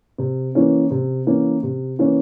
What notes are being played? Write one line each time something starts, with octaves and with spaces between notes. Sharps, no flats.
C3
E3 A#3 C#4
C3
E3 A#3 C#4
C3
E3 A#3 C#4